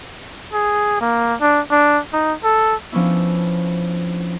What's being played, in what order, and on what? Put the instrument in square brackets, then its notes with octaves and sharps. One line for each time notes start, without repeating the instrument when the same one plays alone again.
[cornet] G#4
A#3
D4
D4
D#4
A4
[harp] F3 B3 C#4 D4 E4